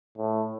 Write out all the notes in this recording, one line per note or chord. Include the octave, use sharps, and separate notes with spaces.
A2